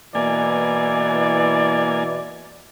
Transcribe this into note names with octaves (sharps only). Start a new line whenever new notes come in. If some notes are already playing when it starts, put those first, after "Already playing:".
B2 E3 A#3 D5 G#5